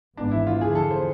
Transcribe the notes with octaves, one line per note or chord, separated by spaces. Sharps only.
G#1 G#2 E3 B3 D4
E4
F4
E2 D3 F3 G#4
A4
C5